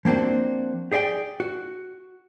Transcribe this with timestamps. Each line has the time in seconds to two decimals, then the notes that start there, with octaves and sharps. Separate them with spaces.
0.05 F3 A#3 C4 D4 F#4
0.92 G4 G#4 D5 E5 G5
1.40 F#4